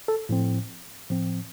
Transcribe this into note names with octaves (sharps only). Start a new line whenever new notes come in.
A4
A2 F3 C4
A2 F3 C4